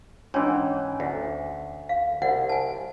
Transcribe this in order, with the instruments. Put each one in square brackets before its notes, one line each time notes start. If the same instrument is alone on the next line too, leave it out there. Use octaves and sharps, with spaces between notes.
[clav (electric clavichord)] G#2 E3 [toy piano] C#4 D4 C#5
[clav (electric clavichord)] D2
[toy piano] F5
[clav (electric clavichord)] C2 [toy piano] F#5
[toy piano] G#5 A5